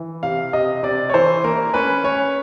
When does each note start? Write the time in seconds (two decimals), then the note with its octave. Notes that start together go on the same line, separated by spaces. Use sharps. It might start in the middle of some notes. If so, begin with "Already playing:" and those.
Already playing: E3
0.23 C3 F5
0.53 C3 D#5
0.83 C3 D5
1.10 C#5
1.14 E3 C5
1.44 A#3 A#4
1.74 C#4 B4
2.04 C#4 C#5